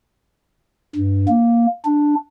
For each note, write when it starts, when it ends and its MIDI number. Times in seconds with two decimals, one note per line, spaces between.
0.96 1.26 43
1.28 1.66 58
1.85 2.15 62